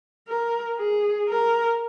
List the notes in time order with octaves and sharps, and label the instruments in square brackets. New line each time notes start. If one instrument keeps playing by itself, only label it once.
[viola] A#4
G#4
A#4